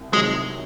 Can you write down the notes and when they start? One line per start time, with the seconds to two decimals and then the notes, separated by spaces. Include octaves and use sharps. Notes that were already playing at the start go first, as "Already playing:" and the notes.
Already playing: C2
0.12 C3 D#3 F#3 G#3 C4